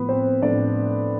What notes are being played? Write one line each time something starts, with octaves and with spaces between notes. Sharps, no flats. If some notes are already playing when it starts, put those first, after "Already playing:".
Already playing: A2 F3 B3 B4
C4 C5
A2 F3 D4 D5